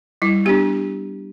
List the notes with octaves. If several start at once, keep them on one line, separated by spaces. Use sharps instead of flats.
G3 E4
B3 D4 G4